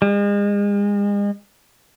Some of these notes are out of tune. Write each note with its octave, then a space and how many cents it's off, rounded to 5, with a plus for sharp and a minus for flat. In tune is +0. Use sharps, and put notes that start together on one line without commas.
G#3 -35